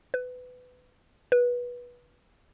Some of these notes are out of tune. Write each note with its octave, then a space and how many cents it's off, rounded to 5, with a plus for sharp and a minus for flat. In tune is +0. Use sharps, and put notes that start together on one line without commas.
B4 +20
B4 -20